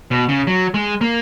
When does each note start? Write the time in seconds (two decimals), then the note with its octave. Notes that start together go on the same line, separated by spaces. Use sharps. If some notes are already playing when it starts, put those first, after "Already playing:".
0.11 B2
0.29 C#3
0.47 F#3
0.74 G#3
1.01 A#3